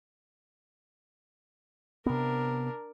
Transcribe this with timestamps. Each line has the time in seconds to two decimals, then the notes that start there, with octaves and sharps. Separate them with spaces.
2.06 C3 B3 D4 A#4